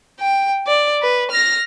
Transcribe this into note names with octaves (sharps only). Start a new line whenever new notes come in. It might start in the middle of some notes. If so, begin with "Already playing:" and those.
G5
D5
B4
F6 A#6